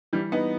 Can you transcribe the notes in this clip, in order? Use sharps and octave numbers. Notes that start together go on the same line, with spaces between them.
E3 G3
B3 D#4